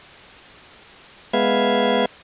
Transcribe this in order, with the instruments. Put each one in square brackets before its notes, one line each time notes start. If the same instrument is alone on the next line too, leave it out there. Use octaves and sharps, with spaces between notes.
[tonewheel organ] G#3 B3 B4 E5 F5 G#6